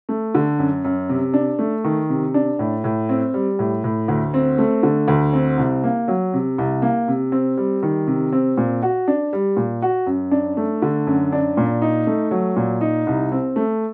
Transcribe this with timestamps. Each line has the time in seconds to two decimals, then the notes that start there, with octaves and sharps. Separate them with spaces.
0.09 A3
0.35 D3
0.59 F#2
0.84 F#2
1.09 C3
1.34 D4
1.59 A3
1.84 D#3
2.09 C3
2.34 D4
2.59 A2
2.84 A2
3.09 C4
3.34 G3
3.59 A2
3.84 A2
4.08 D2
4.34 C4
4.58 A3
4.83 D3
5.08 D2
5.33 C4
5.58 C2
5.84 A#3
6.08 F#3
6.33 C3
6.58 C2
6.82 A#3
7.08 C3
7.32 C4
7.57 G3
7.83 D#3
8.07 C3
8.32 C4
8.57 A#2
8.82 F#4
9.08 D4
9.33 G3
9.57 A#2
9.82 F#4
10.06 F#2
10.31 D4
10.57 A3
10.82 D3
11.07 F#2
11.32 D4
11.57 A#2
11.82 D#4
12.07 A3
12.31 F#3
12.57 A#2
12.81 D#4
13.07 C2
13.32 C4
13.56 A3